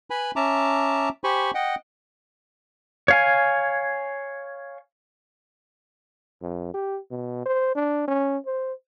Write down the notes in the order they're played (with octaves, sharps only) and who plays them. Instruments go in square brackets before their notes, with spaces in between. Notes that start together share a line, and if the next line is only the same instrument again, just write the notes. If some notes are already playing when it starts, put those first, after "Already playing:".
[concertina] B4 G#5 B5
C#4 E5 A5 A#5 D6
G4 C5 G#5 B5 C#6
D#5 F#5 G5
[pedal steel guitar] C#5 F5 G#5
[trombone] F2
G4
B2
C5
D4
C#4
C5